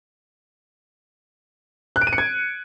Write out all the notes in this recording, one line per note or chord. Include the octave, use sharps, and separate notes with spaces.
F#6
D7
D#7
C#7
G#6